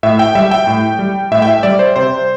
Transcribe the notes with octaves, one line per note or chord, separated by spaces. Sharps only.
A2 E5
G5
G3 E5
G5
A2
G3
A2 E5
G5
E5
G3 D5
C5
C3 C5